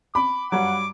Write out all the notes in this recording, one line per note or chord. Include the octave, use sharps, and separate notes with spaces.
B5 D6
G2 F#3 F#5 D6